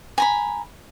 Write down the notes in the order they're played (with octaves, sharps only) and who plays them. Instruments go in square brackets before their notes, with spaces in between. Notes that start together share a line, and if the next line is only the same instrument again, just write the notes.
[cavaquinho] G#5 A#5 B5